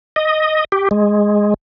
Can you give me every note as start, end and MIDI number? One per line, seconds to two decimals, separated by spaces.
0.16 0.65 75
0.72 0.89 67
0.91 1.54 56